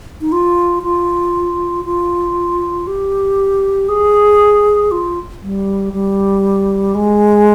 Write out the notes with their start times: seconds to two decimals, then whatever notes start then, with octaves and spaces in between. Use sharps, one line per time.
0.21 D#4
0.32 F4
0.83 F4
1.85 F4
2.87 G4
3.89 G#4
4.91 F4
5.42 G3
5.93 G3
6.95 G#3